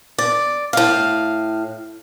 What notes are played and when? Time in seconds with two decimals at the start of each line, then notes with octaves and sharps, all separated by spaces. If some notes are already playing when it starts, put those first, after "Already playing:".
0.19 D5
0.73 A2 F5